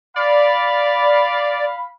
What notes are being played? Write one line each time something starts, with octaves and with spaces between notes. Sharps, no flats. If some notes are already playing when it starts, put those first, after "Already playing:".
D5 F5 B5